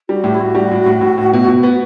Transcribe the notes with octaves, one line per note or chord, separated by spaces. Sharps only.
G3 F#4
A2 G4
E4
A2 F#4
G3
A2
A2
A2
A2
B2
B2
B3